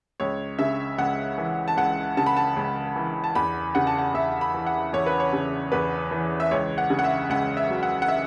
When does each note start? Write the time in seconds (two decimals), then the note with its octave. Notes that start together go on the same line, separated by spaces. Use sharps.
0.20 C#2 C#5
0.59 C#3 E5
0.98 C#2 F#5
1.38 E3
1.68 A5
1.77 C#2 F#5
2.17 C#3 A5
2.26 B5
2.37 A5
2.56 C#2
2.96 E3
3.24 A5
3.35 E2 B5
3.75 C#3 F#5
3.87 A5
3.98 F#5
4.14 E2 E5
4.41 B5
4.54 E3
4.66 F#5
4.93 E2 C#5
5.06 B4
5.20 C#5
5.33 C#3
5.72 E2 B4
6.11 E3
6.40 E5
6.51 C#2 C#5
6.78 F#5
6.90 C#3
6.99 F#5
7.04 E5
7.30 C#2 F#5
7.57 E5
7.70 F#3
7.83 F#5
8.02 F#5
8.08 E5